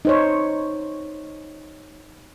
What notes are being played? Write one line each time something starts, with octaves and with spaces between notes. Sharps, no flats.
D#4 C5 C#5